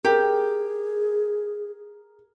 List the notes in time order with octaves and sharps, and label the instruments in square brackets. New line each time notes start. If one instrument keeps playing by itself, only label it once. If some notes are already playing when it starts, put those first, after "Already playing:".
[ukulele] G4 [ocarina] G#4 [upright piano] A#4